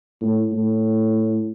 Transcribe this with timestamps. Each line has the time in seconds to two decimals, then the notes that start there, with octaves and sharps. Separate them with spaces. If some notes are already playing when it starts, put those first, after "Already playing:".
0.21 A2
0.52 A2